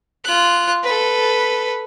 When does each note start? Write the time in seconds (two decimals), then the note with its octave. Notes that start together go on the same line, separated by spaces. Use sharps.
0.24 F4 F#6
0.83 A4 B4